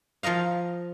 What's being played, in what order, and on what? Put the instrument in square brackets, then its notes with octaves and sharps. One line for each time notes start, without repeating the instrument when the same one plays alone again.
[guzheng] F3 A#4 D#5 F5